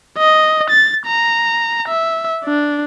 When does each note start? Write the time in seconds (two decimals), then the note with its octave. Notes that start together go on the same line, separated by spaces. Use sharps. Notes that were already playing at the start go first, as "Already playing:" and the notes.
0.18 D#5
0.70 A6
1.06 A#5
1.88 E5
2.45 D4